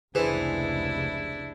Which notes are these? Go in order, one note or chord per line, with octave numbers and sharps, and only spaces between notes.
F1 C#2 E3 D4 E4 G#4 B4 C5